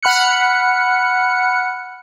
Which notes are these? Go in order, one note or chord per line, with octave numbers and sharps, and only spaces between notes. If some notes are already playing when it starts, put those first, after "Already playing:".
F#5 B5 F6 F#6 C#7